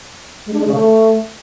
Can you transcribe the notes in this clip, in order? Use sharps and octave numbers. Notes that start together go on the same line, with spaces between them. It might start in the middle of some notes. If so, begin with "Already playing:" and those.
G#3
D4
G#3
C#3
A3